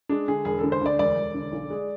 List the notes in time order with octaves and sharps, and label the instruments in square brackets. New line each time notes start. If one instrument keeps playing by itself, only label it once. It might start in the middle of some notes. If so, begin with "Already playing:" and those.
[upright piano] G#3 D4
D3 G#4
E1 G#4
D3 A4
C5
D2 D5
E1 D5
E1
D3
B1
G#3